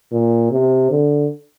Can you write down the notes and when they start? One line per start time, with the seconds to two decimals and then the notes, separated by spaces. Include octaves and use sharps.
0.12 A#2
0.51 C3
0.91 D3